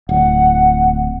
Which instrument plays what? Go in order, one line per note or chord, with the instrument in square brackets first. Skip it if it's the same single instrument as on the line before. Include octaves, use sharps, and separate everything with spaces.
[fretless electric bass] D1 [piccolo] F#5